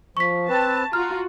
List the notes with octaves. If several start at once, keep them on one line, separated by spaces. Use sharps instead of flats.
F3 C#6 B6
C4 B4 A5
F4 F#4 A#5 F6